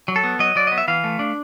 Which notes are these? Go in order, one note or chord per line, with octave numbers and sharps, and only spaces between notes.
F#3
A4
B3
F#3 D#5
F#3 D5
B3 D#5
E5
E3 F5
A3
D4